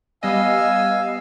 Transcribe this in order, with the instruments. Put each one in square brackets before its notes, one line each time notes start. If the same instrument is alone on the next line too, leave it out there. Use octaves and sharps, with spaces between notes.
[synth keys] G3 B3 D#5 [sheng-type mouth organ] F5 G#5 E6